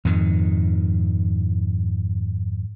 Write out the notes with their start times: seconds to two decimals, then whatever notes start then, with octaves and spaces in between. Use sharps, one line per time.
0.05 F2 G#2 D#3